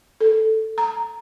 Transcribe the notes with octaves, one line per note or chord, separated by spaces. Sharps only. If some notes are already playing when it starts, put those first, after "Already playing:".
A4
A#5